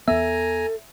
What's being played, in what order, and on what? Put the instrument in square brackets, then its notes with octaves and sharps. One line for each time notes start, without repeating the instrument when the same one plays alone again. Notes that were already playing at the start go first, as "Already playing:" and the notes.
[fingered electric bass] E2 B3 [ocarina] A4 [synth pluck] E5 [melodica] G#5 A#5